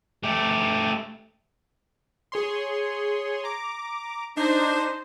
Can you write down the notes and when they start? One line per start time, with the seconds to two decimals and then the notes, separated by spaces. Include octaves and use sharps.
0.23 A3 G4
2.32 G#4 C#5 C6
3.44 A#5 D6
4.37 D4 D#4 C5